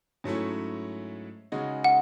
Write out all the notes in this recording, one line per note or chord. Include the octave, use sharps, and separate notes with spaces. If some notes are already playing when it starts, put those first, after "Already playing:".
G#2 F#3 A3 C#4 E4
C#3 G#3 D#4 F#4
F#5